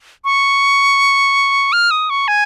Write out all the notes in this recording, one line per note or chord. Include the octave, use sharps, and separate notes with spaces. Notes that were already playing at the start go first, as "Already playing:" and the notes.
C#6
F6
D#6
C#6
G#5